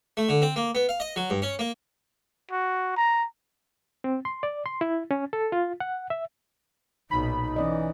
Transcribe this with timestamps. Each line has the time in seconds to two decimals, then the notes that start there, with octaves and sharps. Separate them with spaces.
0.17 A3
0.29 D3
0.42 C4
0.56 A#3
0.75 B3
0.89 F5
1.00 D#5
1.16 F#3
1.30 G2
1.42 C#4
1.59 A#3
2.51 F#4
2.97 A#5
4.04 C4
4.25 C6
4.43 D5
4.66 C6
4.81 E4
5.11 C#4
5.33 A4
5.52 F4
5.80 F#5
6.10 E5
7.11 B1 A#2 D#4 B5
7.56 E3 C#4 D5 D#5